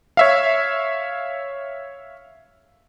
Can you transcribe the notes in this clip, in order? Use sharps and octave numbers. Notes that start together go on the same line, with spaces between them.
C#5 E5 F5